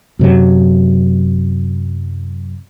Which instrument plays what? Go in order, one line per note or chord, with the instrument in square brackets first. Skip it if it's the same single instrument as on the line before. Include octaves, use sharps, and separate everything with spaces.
[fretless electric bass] F#2 C3 F#3